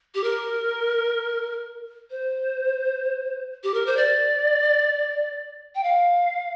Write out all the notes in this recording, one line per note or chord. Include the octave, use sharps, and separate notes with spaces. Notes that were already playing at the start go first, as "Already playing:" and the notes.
G4
A#4
C5
G4
A#4
C5
D5
G5
F5